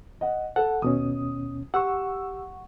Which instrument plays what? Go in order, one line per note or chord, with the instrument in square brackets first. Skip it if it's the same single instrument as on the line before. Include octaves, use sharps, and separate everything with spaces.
[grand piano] D#5 F#5
[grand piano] A4 [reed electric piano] F#5
[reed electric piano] D#2 B2 C#4 [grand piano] D#6
[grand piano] G4 E6 [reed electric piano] F#5 C#6